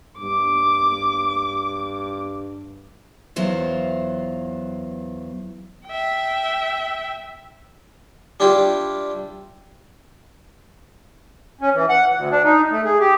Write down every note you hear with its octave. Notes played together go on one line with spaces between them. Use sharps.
G2 D6
E2 F#3 F4 C5
E5 G5
G3 D4 E4 F4 G4
C#4
E3
F#5
D2
D4
D#4
A3
G#4
G4